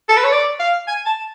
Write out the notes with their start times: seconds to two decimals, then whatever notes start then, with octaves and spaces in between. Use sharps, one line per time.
0.09 A4
0.17 B4
0.24 C#5
0.32 D5
0.60 F5
0.88 G#5
1.06 A5